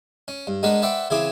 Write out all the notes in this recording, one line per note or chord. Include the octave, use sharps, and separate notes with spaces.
C#4
G2
G#3 B3 D4 A#4 B4
B4 C5 D5 E5 F#5 G5
C#3 E3 C4 E4 G#4 D6